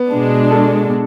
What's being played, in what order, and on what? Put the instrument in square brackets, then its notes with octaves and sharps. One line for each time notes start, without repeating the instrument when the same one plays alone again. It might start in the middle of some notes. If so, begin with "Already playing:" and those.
Already playing: [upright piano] B3
[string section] B2 G#3 D4
[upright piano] A4